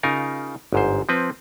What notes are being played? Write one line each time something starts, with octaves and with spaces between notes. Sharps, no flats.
C#3 D#4 F4 A#4
G1 G#2 C5
F3 C4 B4